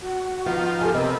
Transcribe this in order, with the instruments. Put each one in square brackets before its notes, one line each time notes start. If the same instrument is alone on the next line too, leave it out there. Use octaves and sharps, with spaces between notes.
[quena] F#4 [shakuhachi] F#5
[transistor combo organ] D#3 F3 F4 [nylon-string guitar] B3
[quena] G4 [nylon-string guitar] A4 G#5 [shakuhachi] A#4
[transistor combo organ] C3 B3 [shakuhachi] A4 [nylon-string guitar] A#4 D#5